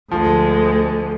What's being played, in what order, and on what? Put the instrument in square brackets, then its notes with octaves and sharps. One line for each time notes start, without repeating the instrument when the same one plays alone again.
[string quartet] D2 D3 G#3 [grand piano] F3